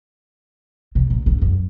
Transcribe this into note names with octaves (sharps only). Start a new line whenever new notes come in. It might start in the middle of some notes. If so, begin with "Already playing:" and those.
C3
A#2
G#2
F#2